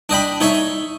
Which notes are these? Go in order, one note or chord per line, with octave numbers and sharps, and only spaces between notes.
D4 D#5 G5 B5
D#4 C#5 E5